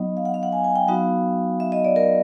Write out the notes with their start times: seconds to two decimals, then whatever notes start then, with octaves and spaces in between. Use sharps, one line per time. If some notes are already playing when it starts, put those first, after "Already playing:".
Already playing: F#3 B3 D#4 D#5
0.17 F5
0.25 F#5
0.34 F5
0.43 F#5
0.53 G#5
0.64 G#5
0.76 G5
0.87 F#3 B3 D#4 F#4 F5
1.60 E5
1.72 D#5
1.84 D5
1.96 A#4